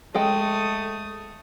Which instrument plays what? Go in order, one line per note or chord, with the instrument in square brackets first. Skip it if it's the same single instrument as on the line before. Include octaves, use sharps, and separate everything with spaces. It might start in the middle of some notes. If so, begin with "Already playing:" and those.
[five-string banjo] G#3 A4 G5 [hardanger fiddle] A3 D#6